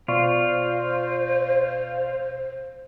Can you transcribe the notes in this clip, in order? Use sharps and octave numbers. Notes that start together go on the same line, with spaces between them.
B2 F4 C5 D5 C#6